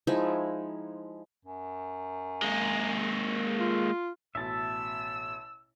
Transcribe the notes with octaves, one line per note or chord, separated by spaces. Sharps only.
F3 G#3 D#4 E4
F#2
G#3 A#3
F4
A1 B2 E5 A5 E6